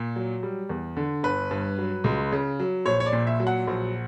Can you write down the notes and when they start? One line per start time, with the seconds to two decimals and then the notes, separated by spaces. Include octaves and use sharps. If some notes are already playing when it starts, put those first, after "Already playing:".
Already playing: A#2
0.16 F#3
0.43 G3
0.69 E2
0.97 D3
1.23 G1 B4
1.51 G2
1.78 F#3
2.04 C#2
2.32 C#3
2.59 F#3
2.85 A#1 C#5
3.00 C#5
3.06 D5
3.13 A#2
3.27 E5
3.40 F#3
3.47 F#5
3.67 A#1